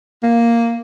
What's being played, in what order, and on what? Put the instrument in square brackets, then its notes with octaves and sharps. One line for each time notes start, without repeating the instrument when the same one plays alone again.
[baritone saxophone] A#3